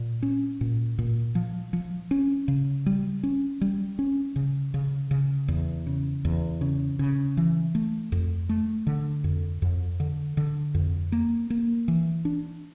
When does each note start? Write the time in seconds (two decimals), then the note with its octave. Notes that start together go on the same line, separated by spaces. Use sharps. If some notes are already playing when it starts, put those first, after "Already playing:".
Already playing: A#2
0.22 C#4
0.61 A#2
0.98 A#2
1.35 F3
1.73 F3
2.11 C#4
2.48 C#3
2.86 G3
3.23 C#4
3.61 G3
3.99 C#4
4.36 C#3
4.74 C#3
5.11 C#3
5.48 E2
5.87 C#3
6.25 E2
6.61 C#3
6.99 C#3
7.37 E3
7.75 A3
8.12 F2
8.49 A3
8.87 D3
9.24 F2
9.62 F2
10.00 D3
10.37 D3
10.75 F2
11.12 A#3
11.50 A#3
11.88 E3
12.25 D4